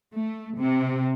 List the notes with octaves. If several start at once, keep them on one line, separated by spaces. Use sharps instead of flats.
A3
C3